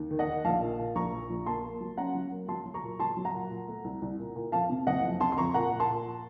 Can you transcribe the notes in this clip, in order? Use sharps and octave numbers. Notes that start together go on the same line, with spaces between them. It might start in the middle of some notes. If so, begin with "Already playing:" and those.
Already playing: D#2
D#3
D#5 F#5
D#3
A#1 F5 A5
A#2
A#2
A#1 A#5 C#6
A#2
A#1
A#3 A5 C6
A#3
F#3
C#4 F#5 A#5
F#3
A#3
F#3 A5 C6
F#3
A#5 C#6
A#2
F#3 A5 C6
F#3
F#5 A#5
A#2
A#2
A3
C2
C2
A#2
A#2
F2 F5 A5
C3
F#1 D#5 F#5
F2
C3 A5 C6
C6
F2 A#5 C#6
A#2 F#5 A#5
A#2
A5 C6
A#2